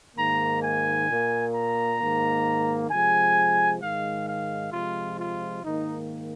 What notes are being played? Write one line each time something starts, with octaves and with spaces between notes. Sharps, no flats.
G#2 D#3 A#3 A#5
G#5
A#2 A#3
A#5
G#2 D#3 A#3
C3 F3 G#3 G#5
G#2 D#3 G#3 F5
F5
C3 F3 G#3 F4
F4
G#2 D#3 A#3 D#4